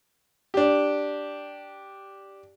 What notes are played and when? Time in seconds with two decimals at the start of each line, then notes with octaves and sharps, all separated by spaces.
0.54 D4 G4